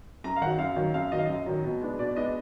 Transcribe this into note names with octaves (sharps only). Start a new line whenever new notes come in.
F#2 A#5
F5
D#3 F#3 F#5
F#2 F5
D#3 F#3
F#2 F5
D#3 F#3 D#5
F5
F#2 D#5
D#3 F#3
B2
G#3 B3 D4
B2 D5
G#3 B3 D4 D#5